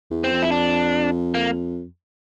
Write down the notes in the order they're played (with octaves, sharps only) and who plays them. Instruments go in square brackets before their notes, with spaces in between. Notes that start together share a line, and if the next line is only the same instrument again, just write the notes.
[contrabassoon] E2
[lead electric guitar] C4
[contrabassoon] F2
[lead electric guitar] E4
D4
A#3